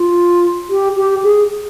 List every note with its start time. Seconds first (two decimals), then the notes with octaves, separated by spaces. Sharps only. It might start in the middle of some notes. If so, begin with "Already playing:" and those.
Already playing: F4
0.70 G4
0.96 G4
1.24 G#4